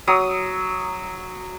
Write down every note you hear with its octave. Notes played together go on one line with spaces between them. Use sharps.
F#3 D#6